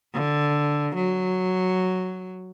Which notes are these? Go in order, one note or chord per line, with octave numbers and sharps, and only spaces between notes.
D3
F#3